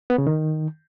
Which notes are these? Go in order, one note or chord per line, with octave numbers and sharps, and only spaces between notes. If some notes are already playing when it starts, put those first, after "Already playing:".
B3
C#3
D#3